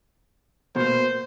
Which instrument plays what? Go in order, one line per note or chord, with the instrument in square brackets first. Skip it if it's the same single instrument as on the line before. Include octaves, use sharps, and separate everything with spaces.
[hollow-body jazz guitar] B2 A#3 [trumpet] C5